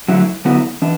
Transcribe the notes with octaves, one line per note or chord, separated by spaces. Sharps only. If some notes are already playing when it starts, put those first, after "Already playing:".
D3 F#3 A3 E4
D3 F#3 B3 E4
E3 D4